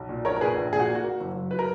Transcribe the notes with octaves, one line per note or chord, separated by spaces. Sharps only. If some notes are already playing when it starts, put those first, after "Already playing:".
Already playing: B1
A#2
A#1 A#4 C#5
A#4
A#2 G#4 B4
A#1
A#2 G#4
F#4
A#3
F#4
A#3
F#1
F#2
F#3 B4
A#4